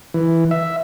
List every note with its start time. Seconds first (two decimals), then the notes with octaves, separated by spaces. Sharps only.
0.14 E3
0.51 E5